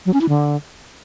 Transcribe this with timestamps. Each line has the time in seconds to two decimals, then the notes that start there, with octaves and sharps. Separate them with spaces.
0.06 F#3
0.13 C#4
0.21 E4
0.29 D3